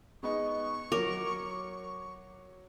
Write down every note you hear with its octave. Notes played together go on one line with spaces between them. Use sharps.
G#3 B3 D#4 C#6
F#3 A#4 C#5 D6